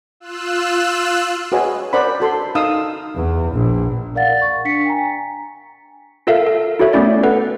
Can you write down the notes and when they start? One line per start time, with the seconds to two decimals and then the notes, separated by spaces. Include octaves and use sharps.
0.20 F4 E6 F#6
1.52 F#4 G#4 B4 C#5 D#5 G#5
1.93 A#4 C5 D5 F#5 B5
2.20 F#4 A4 C6
2.55 D#4 F5 D#6 E6
3.15 E2
3.53 A#1
4.15 A#4 D5 F5 F#5 A6
4.41 C#6
4.65 D4 B6 C#7
4.85 G5 G#5 A#5
4.97 G#5
6.27 F4 A4 A#4 E5 F5
6.47 A4
6.79 E4 F#4 A4 C#5 E5
6.93 A3 B3 C#4 E4 D5
7.23 A4 B4 F#5